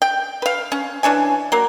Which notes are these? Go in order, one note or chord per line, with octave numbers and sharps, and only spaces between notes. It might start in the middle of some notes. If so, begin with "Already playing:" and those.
G5
B4 F5
C#4
E3 D4 C#5 G#5
F#3 A#3